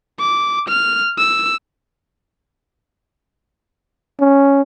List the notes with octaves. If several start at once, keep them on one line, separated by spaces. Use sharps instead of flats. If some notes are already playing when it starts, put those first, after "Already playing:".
D6
F6
E6
C#4